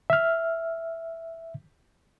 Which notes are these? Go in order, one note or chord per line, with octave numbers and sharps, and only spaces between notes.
E5 F6